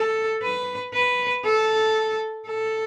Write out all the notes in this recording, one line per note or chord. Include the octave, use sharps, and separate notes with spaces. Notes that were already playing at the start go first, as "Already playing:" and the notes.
Already playing: A4
B4
B4
A4
A4